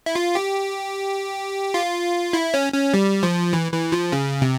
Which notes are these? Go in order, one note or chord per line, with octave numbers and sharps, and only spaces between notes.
E4
F4
G4
F4
E4
C#4
C#4
G3
F3
E3
E3
F3
C#3
C3